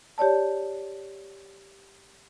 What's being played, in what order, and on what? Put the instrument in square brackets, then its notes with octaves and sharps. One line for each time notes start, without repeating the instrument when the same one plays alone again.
[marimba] G4 C#5 D5 A5